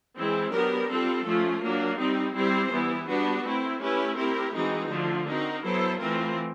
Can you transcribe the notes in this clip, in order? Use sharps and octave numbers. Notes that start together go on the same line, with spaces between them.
E3 G#3 C4 E4
F#3 B3 D4 G4 A#4
G3 C4 F4 A4
F3 A3 C#4 F4
F#3 A#3 D4
G3 C4 D#4
G3 C4 E4 G4 C5
E3 G3 B3 E4
G3 B3 D4 F#4 B4
A3 C4 E4
A3 C#4 E4 G4 B4
C4 E4 G4 A#4
E3 G#3 C4 D#4 F#4
D3 F3 A3
C4 D#4 F#4 A#4
F#3 B3 E4 A4 C5
E3 A3 C4 F4 A#4